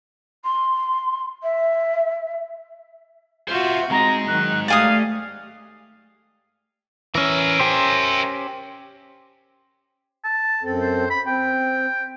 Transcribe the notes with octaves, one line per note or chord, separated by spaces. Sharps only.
C6
E5
F4 F#4 C5 E5
G#3 C4 D#4 A#5
D#3 F#3 F#6
A3 G4 D5 F5 G#5 D#6
E3 C#4 A#4 E5
C#4 G4 C5
A5
F#2 C4 A4
C5
B5
C4 G5